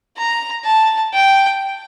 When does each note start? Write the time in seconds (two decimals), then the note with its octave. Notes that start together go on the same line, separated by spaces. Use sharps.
0.18 A#5
0.66 A5
1.14 G5